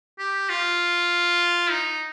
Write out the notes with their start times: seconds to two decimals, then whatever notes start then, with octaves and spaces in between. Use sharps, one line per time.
0.19 G4
0.49 F4
1.71 D#4